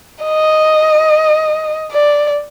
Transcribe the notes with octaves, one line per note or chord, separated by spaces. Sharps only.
D#5
D5